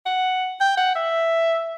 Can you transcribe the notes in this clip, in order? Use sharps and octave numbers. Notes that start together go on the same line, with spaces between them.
F#5
G5
F#5
E5